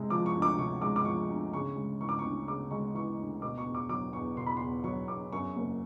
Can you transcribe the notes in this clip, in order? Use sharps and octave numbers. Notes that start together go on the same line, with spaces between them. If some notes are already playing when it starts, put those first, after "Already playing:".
Already playing: C3 G#3
F3 D6
C#6
D2
D6
C3 C#6
G#3 D6
D6
F3 C#6
D2
C#3 C#6
G#3
E3 C#6
D6
C#6
D2
C#3 D6
G#3 C#6
E3 C#6
D2
B2 D6
C#6
E2
D6
F#3 D6
E2 C#6
B2 C6
B5
E2 C6
F#3 C#6
E2 D6
F#2 C#6
F#1